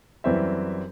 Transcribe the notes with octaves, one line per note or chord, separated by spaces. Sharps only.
F#2 E3 G3 C4 E5